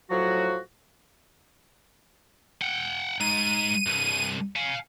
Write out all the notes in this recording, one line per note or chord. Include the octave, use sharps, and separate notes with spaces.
A2 F3 F#3 F#4
F#5 G5
G#3 D#4 D#7
C2 G2
F5 G#5